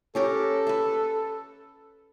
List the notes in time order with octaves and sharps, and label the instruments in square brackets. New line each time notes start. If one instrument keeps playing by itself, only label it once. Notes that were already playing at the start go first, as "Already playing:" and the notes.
[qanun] C#4 G4 A#4 [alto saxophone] A4
[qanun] B4 E5